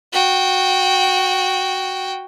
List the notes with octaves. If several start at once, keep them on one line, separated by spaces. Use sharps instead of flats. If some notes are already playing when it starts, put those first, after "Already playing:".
F#4 G5